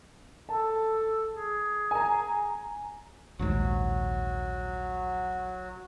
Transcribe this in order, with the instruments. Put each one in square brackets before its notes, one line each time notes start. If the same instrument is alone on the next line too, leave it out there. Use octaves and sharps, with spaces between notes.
[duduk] A4 [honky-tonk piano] A5
[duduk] G#4
[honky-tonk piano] G#5 A#5
[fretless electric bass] A#1 D#2 G#2 [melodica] F#3 F#4